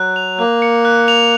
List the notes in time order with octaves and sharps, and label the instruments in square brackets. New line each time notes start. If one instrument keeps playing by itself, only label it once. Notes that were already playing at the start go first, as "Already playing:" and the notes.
Already playing: [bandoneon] F#3 [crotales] F#6
[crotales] F7
[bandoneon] A#3 [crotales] F#6
[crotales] C#7
F#6
F7